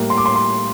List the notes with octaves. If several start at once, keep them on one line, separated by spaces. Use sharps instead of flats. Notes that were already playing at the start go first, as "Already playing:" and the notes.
Already playing: A2 G3 A#3
C6
D6
C6
C6